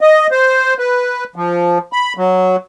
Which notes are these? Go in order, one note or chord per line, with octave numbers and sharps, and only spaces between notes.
D#5
C5
B4
F3
B5
F#3